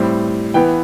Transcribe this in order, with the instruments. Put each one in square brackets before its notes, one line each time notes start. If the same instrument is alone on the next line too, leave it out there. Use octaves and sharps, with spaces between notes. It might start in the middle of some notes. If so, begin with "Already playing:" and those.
Already playing: [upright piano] A2 G3 C4
E3 B3 G5